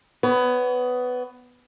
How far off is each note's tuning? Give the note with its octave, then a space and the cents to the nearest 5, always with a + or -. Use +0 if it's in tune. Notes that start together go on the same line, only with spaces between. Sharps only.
B3 +15 C#5 +35